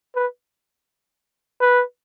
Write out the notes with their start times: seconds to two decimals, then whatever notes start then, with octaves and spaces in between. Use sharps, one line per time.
0.15 B4
1.60 B4